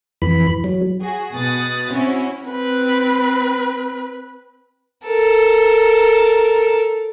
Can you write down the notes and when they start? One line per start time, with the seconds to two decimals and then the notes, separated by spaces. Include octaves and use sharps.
0.22 F2 E3 B5
0.64 F#3
1.01 F#4 G#4
1.33 B2 D#6 F#6 A6
1.92 C4 C#4 E4 F#4
2.46 C4 B4
5.06 A4 A#4